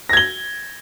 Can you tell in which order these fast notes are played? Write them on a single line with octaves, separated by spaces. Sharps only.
A#6 G#6 G7